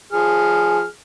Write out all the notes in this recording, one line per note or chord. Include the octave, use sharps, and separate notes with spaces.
F3 G#4 F6